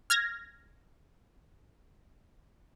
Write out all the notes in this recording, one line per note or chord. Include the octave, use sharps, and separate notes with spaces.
F6 G#6 A#6